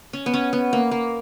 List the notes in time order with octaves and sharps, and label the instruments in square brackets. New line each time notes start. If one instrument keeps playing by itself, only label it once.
[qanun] C#4
B3
C#4
B3
A#3
A#3